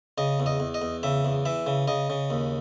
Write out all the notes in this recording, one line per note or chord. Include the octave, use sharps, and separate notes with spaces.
C#3 D#5
E2
D#5
E2
D#5
E2
C#3 E5
E2
E3 E5
C#3
C#3 D#5
C#3
D#2